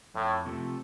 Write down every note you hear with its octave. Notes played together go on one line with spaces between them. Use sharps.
F2 A2
C3 F3 A3